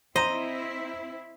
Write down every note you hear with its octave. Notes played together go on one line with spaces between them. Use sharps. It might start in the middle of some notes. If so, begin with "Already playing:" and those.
C4 E4 C5 D#5 A#5